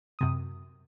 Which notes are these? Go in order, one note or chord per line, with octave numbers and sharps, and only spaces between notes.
F#2 C3 D#6